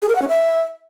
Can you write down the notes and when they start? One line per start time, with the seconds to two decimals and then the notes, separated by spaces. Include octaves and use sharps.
0.02 G#4
0.09 A#4
0.15 F#5
0.22 C#4
0.28 E5